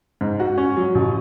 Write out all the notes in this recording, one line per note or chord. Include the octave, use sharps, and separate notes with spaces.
G#2
F#4
C#4
F#3
A1